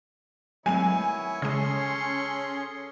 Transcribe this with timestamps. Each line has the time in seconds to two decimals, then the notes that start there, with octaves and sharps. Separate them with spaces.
0.66 D#3 F#3 G#3 A3 B3 E4 C#5 G#5
1.42 C#3 G#3 C#4 G#4 A4 C#5 C6